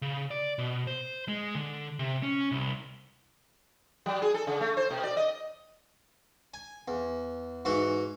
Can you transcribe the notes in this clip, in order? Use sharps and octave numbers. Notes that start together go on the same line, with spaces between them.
C#3
D5
B2
C5
G#3
D3
C3
C#4
C2
F#3
G#4
A4
C#3
A3
C5
B2
D5
D#5
G#5
E2
G#2 E3 F#4